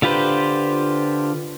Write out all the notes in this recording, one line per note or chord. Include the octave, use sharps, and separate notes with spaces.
D3 F4 G4 B4 C5